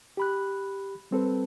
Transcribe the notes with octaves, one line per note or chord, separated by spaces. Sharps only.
G4 B5 F#6
G3 C4 A4 B4